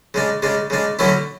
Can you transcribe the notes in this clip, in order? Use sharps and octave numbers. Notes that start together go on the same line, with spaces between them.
C#3 G#3 D4
C#3 G#3 D4
C#3 G#3 D4
D3 F#3 A3 C#4 E4